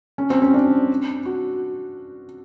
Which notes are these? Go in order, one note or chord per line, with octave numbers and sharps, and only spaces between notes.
C#4
C4
C#4
D4
F#4